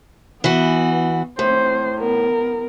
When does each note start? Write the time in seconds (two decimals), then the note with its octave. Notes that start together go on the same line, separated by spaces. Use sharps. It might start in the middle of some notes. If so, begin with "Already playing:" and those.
0.44 E3 B3 F#4
1.39 A2 C4 C5
1.97 B3 A#4